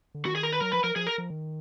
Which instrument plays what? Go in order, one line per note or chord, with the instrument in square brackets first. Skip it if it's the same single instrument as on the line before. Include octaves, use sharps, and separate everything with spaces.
[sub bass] D3
[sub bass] D#3 [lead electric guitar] F#4
[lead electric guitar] G#4
A#4
B4
[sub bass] F#3 [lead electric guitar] A#4
[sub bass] F3 [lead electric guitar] B4
[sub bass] F3 [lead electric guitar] A#4
[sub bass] F3 [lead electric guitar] G#4
[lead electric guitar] A#4
[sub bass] F3
D#3